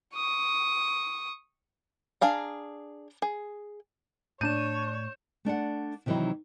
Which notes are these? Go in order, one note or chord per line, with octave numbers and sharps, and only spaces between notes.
C#6 D#6
D4 G#4 F5 A#5
G#4
A2 D4 C#5 G6 D#7 E7
A3 D4 D5 F#5
C3 D#3 E3 F#3 D#4 E4